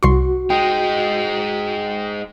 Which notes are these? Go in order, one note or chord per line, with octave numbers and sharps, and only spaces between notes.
C2 F#4 C6 C#6
G#3 D#4 G5